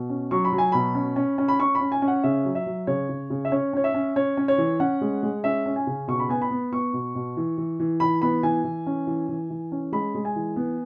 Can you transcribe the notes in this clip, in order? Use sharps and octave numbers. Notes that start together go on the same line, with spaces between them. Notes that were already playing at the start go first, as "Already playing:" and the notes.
Already playing: B2
C#4
F#3 C#6
B5
F#3
G#5
B2 B5
C#4
C#4
C#4
B5
C#4 C#6
B5
C#4
G#5
C#4
F#5
C#3 E5
F#3
E5
F#3
C#3 C#5
C#3
C#3
E5
C#4 C#5
C#4 C#5
E5
C#4
C#4 C#5
C#4
C#5
E3
C#4 F#5
G#3
G#3
C#4 E5
C#4
G#5
C#3
B2 C#6
B5
B3 G#5
B5
B3
B3 C#6
B2
B2
E3
E3
E3
E3 B5
B3 B5
E3 G#5
E3
C#4
E3
E3
E3
C#4
G#3 B5
G#3
G#5
E3
B3